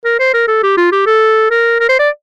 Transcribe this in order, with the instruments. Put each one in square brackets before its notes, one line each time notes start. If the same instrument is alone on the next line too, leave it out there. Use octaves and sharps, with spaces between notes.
[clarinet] A#4
C5
A#4
A4
G4
F4
G4
A4
A#4
A#4
C5
D5